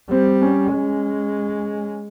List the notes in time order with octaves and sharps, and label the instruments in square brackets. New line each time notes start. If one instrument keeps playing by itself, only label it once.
[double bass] G3 [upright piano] C4
[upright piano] C#4
[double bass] G#3